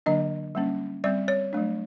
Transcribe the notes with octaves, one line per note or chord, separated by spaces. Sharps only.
D3 F#3 A#3 D4 D#5
G3 A#3 C#4
G3 C4 D5
C#5
F#3 A3 D4